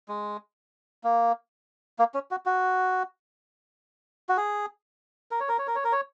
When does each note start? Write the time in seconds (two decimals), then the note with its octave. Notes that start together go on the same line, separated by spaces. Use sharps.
0.08 G#3
1.04 A#3
1.99 A#3
2.14 C#4
2.31 F#4
2.46 F#4
4.29 F#4
4.37 G#4
5.31 A#4
5.40 C#5
5.49 A#4
5.58 C#5
5.67 A#4
5.75 C#5
5.84 A#4
5.92 C#5